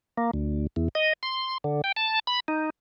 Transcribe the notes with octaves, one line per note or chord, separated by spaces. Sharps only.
A#3
D2
E2
D#5
C6
D3
G5
A5
B5
D#4